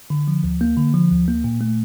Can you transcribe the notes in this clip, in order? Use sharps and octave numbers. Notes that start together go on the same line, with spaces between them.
D3
F3
D2
A#3
D3
F3
D2
A#3
A#2
A3